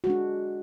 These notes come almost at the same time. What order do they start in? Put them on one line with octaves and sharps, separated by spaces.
F#4 G#3 D4